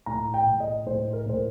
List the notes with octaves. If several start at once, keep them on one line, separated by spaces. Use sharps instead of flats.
A2 A#5
G5
A2
D#5
A2 C5
A#4
A2 C5